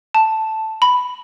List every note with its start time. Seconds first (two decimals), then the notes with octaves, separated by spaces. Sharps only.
0.15 A5
0.82 B5